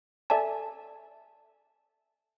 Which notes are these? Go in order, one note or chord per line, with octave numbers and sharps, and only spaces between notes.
A4 D5 E5 G#5 A5